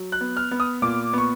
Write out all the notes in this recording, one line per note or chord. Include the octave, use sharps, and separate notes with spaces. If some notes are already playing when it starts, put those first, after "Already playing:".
Already playing: F#3
F#6
B3
F6
B3
D#6
A#2 D6
B3 C#6